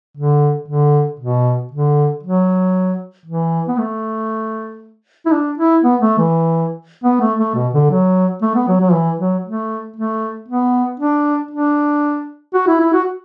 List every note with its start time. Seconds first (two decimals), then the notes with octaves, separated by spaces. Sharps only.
0.17 D3
0.68 D3
1.19 B2
1.72 D3
2.23 F#3
3.26 E3
3.68 B3
3.78 A3
5.26 E4
5.32 D4
5.58 E4
5.84 B3
6.01 A3
6.18 E3
7.04 B3
7.21 A3
7.39 A3
7.55 B2
7.74 D3
7.91 F#3
8.42 A3
8.55 B3
8.68 F#3
8.81 F#3
8.93 E3
9.19 F#3
9.45 A3
9.96 A3
10.49 B3
11.00 D4
11.51 D4
12.54 F#4
12.68 E4
12.81 E4
12.93 F#4